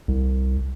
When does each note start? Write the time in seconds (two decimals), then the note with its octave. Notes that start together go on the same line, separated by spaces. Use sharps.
0.08 C2